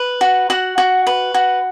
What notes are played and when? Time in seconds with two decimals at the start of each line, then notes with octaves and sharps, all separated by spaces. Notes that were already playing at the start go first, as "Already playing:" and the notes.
Already playing: B4
0.21 F#4
0.50 F#4 F#5
0.78 F#4
1.07 B4
1.34 F#4